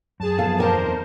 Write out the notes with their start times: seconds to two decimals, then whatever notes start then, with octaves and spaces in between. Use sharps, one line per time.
0.20 F#2 G#4 A5
0.38 F#2 F3 B3 A4 F5
0.58 A#4 C5 D5 G#5 A5
0.74 E2 C4 D#4